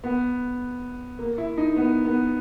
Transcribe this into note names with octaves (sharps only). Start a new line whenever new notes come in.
B3
A#3
E4
D#4
B3
B3